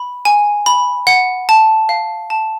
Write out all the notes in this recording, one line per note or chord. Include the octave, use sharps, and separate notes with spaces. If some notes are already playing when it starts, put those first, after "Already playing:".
Already playing: B5
G#5
B5
F#5
A5
F5
A5